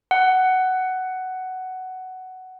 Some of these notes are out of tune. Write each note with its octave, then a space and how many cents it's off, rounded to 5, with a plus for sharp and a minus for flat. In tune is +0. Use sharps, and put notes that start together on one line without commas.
F#5 +10